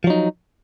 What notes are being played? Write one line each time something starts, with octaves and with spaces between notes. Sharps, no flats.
F3 F#3 D#4